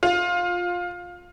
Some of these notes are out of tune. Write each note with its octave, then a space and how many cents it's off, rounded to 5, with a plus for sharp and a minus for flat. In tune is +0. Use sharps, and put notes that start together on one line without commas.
F4 +15